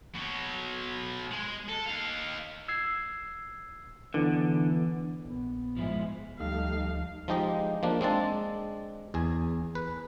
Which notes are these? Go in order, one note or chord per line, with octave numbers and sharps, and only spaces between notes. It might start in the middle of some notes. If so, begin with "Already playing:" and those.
B2 F#3
G#3
A4
D#4 F5
E6 G#6 C7
D3 E3 B3
A#1 B3
G#2 F3 G#3 E4
D2 F3 G3 A3 D#4 F5
F3 G#3 D#4 G4 D#5
F3 A#3 D4
G#3 C4 D4 A5
E2 G#4
B4